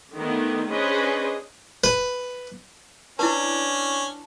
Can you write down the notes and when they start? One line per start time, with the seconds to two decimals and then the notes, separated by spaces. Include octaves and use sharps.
0.15 D3 D#3 A3 B3
0.72 C#4 D4 G#4 B4 C5 D#5
1.84 B4
3.19 C#4 D4 E4 B4 A5